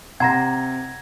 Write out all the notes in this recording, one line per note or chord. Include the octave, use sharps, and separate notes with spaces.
C3 F#5 A#5 C6 G#6 A#6